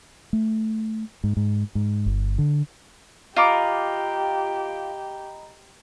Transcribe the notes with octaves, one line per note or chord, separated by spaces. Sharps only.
A3
G#2
G#2
G#2
G1
D3
F4 G4 D#5 A#5 B5 D6